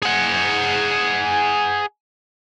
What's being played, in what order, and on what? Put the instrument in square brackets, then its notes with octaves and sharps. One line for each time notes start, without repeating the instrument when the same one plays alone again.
[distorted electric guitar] G#4 F#5